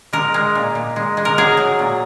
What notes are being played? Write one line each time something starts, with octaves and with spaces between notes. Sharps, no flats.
G#3 A#4
G#3
A#2
A#2
G#3
G#3
A#4
F#3 G#4
F#3
A#2